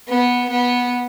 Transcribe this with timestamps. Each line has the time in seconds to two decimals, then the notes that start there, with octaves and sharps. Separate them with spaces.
0.09 B3
0.51 B3